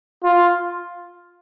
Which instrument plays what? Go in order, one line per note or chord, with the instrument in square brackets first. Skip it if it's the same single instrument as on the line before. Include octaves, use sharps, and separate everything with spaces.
[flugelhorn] F4